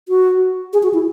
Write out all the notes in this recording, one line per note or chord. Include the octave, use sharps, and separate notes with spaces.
F#4
G#4
F#4
E4